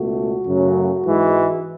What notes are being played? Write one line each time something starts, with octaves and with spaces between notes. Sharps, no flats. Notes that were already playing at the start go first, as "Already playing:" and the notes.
Already playing: C#2 B2 A3 F#4
F#2 C#3 F#3 A3
G#2 E3 G#3